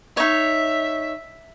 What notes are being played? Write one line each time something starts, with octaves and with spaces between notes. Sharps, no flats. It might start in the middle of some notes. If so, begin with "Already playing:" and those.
D#4 C#5 E5